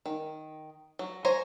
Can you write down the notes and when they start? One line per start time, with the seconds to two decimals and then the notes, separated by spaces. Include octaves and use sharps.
0.06 D#3
0.99 F#3
1.25 C5 C#5 G#5 A#5